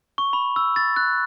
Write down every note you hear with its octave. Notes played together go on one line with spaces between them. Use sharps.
C#6
B5
E6
A6
F#6